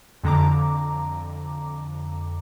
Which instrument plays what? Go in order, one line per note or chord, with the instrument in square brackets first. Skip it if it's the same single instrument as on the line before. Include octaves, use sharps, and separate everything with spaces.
[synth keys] F2 D3 A#5 D6